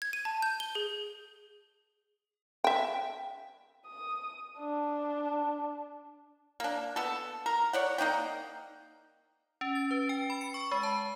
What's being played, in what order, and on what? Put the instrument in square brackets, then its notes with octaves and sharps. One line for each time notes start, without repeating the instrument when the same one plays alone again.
[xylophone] G#6
D#7
A5
G6
G7
G#4
[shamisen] E5 G5
[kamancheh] D#6
D4
[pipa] A#3 D4
B3 A4
A#4
C#5 D5 F#5
A#3 D#4 D5 G5
[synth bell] C#4
A6
B4
G5
B5
C#7
C#6
G#3
A5